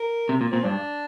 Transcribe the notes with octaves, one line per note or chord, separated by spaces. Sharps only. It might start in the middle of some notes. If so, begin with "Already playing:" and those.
Already playing: A#4
C3
A#2
A#2 C4
G2 D4